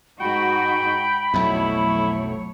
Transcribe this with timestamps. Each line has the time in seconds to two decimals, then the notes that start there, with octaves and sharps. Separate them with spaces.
0.20 G#2 D#4 F#4 G5 B5
1.34 B1 F2 F#3 A3 E4 C#5